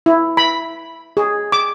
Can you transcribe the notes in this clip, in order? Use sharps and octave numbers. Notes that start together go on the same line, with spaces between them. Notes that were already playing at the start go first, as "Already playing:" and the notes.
E4
B5
G#4
D6